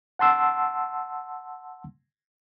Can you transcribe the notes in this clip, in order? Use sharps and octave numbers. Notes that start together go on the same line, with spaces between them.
F#5 A5 C6 E6